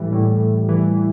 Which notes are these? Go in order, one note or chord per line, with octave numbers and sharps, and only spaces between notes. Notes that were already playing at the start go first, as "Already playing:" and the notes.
Already playing: A2 E3 G3
A2
A2
E3
E3